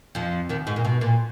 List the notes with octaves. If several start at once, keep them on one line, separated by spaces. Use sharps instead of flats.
F2 F3
D#2 D#3
G#2
A#2
B2
A#2